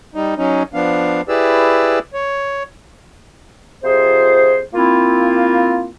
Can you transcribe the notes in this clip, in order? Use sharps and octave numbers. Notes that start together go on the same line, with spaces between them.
G3 D#4
F#3 C#4 D#4
F3 B3 D4 F5
E4 G4 G#4 B4 D5 E6
C#5
F2 C3 F4 G#4 C5
A#3 C4 E4 F4